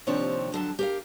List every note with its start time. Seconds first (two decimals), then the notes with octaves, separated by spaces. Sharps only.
0.07 D#2 C3 F3 C4 D4 C#5
0.52 F2 D3 F#3 A5
0.79 G4 A#4 F5